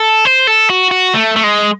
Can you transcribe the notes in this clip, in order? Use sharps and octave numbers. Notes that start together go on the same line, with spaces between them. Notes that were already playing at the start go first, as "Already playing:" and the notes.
Already playing: A4
C5
A4
F#4
F#4
A3
A3
G#3